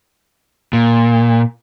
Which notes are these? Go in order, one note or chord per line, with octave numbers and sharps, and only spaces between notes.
A#2